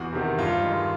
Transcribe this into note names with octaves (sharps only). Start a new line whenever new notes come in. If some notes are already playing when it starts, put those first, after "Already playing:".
Already playing: E2 F#4
C3 D#3
G2 F4
D#3 G#3